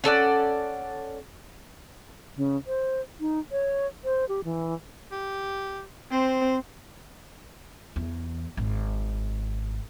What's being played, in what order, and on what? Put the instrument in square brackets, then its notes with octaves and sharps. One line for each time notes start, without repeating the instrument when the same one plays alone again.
[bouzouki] C#4 A4 D5 F#5
[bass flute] C#3
C5
D#4
C#5
C5
G4
E3
[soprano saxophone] G4
[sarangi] C4 [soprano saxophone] C5
[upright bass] E2
G#1